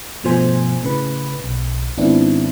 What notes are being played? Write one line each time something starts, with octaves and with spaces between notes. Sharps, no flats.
G2 B2 F3 A3 C5 G#5
A2 C#3 B4
B1
G#2 D#3 B3 C4 D4 E4